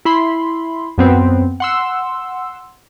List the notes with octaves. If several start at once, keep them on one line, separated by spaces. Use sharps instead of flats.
E4 B5 C6
F#2 B3 C4
F#5 C6 E6